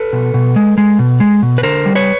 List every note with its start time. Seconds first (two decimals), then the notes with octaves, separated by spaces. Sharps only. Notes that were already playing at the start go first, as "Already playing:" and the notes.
Already playing: A4 B4
0.13 B2
0.34 B2
0.56 G#3
0.78 G#3
0.99 B2
1.20 G#3
1.43 B2
1.58 B4
1.63 D3 A#4 C5
1.86 G3
1.95 B4 C#5